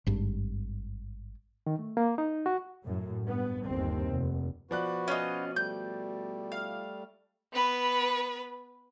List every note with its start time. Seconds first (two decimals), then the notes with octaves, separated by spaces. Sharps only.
0.07 G#1 G2
1.67 D#3
1.79 A3
1.97 A#3
2.18 D#4
2.46 F#4
2.83 F#2 A2
3.23 G2 B3
3.64 G1 D#2 C4
4.11 F1
4.71 B2 F3 F#4 B4 D5 F#6
5.08 C#4 F4 D#5
5.56 G3 A3 G6
6.52 F5
7.53 B3 B4